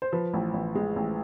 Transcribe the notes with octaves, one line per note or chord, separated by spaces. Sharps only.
C5
F3 B4
A1
A1
G#3
A1